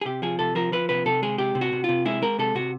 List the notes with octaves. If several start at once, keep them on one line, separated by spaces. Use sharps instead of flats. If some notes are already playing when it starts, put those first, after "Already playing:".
G#4
C3 G4
F3 G#4
C3 A4
F3 A#4
F3 B4
C3 B4
C3 A4
G#3 G#4
C3 G4
C3
F#4
C3
C3 F4
G#3 E4
G#3 A#4
C3 A4
C3 F#4